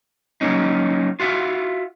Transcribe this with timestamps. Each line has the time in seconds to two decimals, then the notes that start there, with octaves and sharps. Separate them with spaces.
0.41 F#3 A#3 C#4 D#4
1.20 F4 F#4 E5 F5